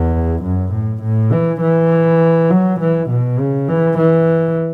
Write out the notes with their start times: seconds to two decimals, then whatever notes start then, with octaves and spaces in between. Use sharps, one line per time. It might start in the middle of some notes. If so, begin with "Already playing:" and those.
Already playing: E2
0.43 F#2
0.72 A2
1.03 A2
1.32 E3
1.61 E3
2.50 F#3
2.80 E3
3.10 B2
3.39 C#3
3.68 E3
3.98 E3